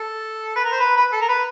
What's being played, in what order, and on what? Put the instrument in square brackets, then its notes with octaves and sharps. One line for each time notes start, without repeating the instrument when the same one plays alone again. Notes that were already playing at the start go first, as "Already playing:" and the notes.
Already playing: [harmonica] A4
B4
A#4
C5
B4
B4
A4
A#4
B4